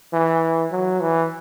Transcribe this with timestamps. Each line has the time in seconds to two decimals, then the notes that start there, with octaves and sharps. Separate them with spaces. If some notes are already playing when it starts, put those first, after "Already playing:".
0.13 E3
0.72 F#3
1.01 E3